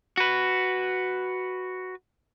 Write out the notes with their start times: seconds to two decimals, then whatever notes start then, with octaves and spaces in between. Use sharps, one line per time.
0.17 F#4 B4